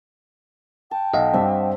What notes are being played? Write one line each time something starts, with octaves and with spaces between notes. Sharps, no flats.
G5 A5
B1 D#5 F5 F#5
G2 C4 D4 E5